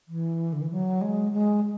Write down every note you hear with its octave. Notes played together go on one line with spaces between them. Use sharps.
E3
D3
E3
F#3
G#3
G#3